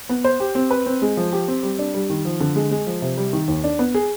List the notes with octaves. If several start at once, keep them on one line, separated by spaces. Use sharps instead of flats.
B3
C5
G4
C4
B4
C4
G#3
F3
G4
C4
G3
D4
G3
D#3
F3
D3
G#3
G#3
F3
C3
G3
D#3
D#2
D4
B3
G#4